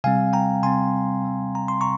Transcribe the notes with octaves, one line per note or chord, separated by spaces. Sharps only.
C3 G3 C4 F5 G#5
G5 A#5
C3 G3 C4 G#5 C6
C3 G3 C4
A#5
C6
C3 A#5 C#6